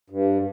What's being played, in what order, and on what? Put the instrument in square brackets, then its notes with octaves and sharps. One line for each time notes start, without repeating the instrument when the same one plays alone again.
[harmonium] G2